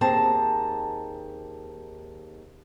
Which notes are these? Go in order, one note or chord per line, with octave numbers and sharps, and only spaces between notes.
D#2 C4 G#4 A5 A#5